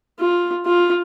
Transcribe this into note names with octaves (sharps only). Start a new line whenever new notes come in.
F4
F4